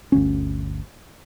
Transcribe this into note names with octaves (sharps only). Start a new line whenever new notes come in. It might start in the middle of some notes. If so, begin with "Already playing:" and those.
G1 D2 C#4